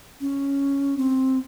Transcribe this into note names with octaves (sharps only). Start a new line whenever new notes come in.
C#4
C4